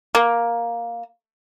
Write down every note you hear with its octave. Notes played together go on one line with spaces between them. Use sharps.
A#3